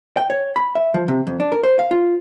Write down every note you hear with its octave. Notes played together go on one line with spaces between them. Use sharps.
G5
C#5
B5
E5
F3
C3
F2
D4
A#4
C5
F5
F4